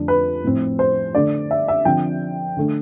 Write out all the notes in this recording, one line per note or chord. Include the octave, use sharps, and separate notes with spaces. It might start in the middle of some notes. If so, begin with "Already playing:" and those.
Already playing: F2 D3 A3 D4
B4
A2 F3 C4
C5
D3 A3 D4 D5
E5
E5
D3 F3 C4 G5
D3 A3 D4